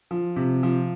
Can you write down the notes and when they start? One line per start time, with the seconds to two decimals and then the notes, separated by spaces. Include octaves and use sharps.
0.11 F3
0.36 C3
0.63 F3